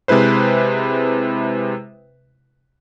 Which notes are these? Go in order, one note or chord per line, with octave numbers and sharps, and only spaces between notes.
C3 G#3 E4 B4 C5